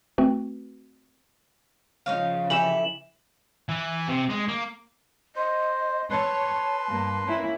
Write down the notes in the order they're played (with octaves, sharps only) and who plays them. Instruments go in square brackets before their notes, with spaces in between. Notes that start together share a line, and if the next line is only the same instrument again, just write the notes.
[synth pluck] A3 C4 F#4 B4
[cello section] C#3 F3 [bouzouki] D#4 C#5 F5
[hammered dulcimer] E3 [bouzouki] G4 A4 E5 [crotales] E7 F#7
[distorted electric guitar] E3
C3
G#3
A#3
[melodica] C5 [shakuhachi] D#5
[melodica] B4 C6 [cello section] C#5 [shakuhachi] A5
[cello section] G2 A#3
A#3 C#4 E4